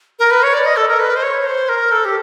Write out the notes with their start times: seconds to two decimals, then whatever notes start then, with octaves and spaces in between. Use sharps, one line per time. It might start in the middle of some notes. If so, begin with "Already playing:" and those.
0.19 A#4
0.31 B4
0.43 C#5
0.53 D5
0.65 D#5
0.76 A4
0.88 A#4
0.99 B4
1.16 C5
1.23 C#5
1.46 C5
1.69 A#4
1.92 A4
2.05 G4